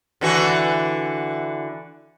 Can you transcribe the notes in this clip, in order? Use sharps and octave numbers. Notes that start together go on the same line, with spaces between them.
D3 E3 F#4